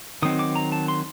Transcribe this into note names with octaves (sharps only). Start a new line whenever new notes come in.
D#3 F#3 C4 D#4 D#6
D6
A#5
A5
C6